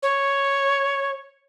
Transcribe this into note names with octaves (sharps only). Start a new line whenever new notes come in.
C#5